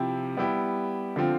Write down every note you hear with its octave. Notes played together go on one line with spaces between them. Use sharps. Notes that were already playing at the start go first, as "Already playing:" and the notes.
Already playing: C3 F3 C4 E4 G4
G3 B3 E4 G4
D3 F3 C4 F4